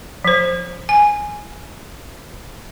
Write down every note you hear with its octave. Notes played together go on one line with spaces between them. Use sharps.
F3 C5
G#5